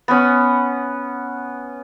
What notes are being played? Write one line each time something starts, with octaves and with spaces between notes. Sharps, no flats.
B3 C#4